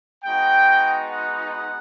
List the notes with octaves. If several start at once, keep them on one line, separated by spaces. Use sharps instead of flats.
G#3 B3 D#4 F#4 G5
F#5
F#5